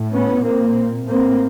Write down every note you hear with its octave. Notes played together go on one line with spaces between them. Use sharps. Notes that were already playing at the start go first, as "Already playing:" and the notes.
Already playing: A2
B3 C#4
A#2 A#3 C4
A2 A#3 C4